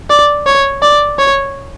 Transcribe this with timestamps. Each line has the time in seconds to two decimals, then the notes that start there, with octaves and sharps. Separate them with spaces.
0.10 D5
0.47 C#5
0.82 D5
1.19 C#5